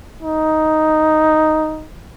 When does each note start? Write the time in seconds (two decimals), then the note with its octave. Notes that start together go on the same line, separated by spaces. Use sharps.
0.23 D#4